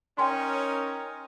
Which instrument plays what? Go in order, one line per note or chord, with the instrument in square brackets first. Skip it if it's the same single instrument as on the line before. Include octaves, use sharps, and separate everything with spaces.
[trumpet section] C#4 D#4 A#4 [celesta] G5 G#5 C6